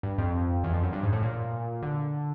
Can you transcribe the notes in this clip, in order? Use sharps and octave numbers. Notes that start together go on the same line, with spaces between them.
G2
F2
E2
F2
F#2
G2
G#2
A2
A#2
D3